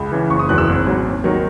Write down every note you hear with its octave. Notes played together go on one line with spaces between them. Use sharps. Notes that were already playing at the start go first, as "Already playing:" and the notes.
Already playing: C#2 B5
C#3 E3
F#1 C#6
D#6
E2 D#3 F#3 F#6
E6
G#1
G#2 F#3
D#2
D#3 F#3